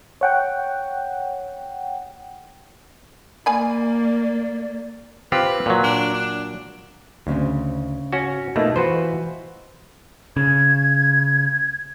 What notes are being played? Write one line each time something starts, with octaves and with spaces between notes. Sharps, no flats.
C#5 F#5 G5
A#3 D5 F5 G#5 B5
C4 F4 G4 B4
A#2 F#3
D4
D4
D2 G#2 C#3 C4
C#4 F#4
B2 A3 A#3 D#4 F4
E3 F4 F#4 B4 C5
C#3 G#6